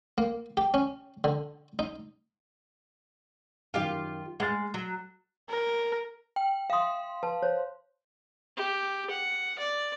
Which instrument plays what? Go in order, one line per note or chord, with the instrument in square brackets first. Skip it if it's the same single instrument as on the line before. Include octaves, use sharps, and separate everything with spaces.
[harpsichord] A#3
G4
C#4
D3
D#4
[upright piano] F#2 D#3 [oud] F4 G4 F5
[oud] G#3 [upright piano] F#5 F6 A6
[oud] F#3
[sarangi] A#4
[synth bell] G5
[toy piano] E5 D#6 [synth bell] F5 C6
[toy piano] B4 A5
C5 C#5
[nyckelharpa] G4
F#5
D5